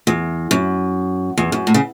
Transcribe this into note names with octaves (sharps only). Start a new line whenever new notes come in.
E2
F#2
E2
F#2
A2
C#3